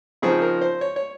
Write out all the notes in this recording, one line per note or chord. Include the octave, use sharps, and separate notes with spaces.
C#3 F3 C4 D#4 G#4
A#4
C5
C#5
C#5